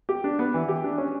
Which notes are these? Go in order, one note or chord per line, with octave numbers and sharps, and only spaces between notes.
G4
D4
B3
E3
G4
D4
C#4